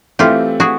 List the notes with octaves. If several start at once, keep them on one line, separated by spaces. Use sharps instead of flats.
E3 A3 C4 E4 F4 G4
F#4 G#4